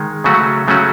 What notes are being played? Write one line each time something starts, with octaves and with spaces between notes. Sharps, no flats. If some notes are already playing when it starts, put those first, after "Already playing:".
Already playing: D#3 G#3
C#3 F#3 A3 C#4 F#4
C#3 F#3 A3 C#4 F#4